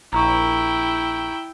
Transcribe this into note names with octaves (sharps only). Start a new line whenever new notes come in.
A#1 E4 G5 A#5 C#6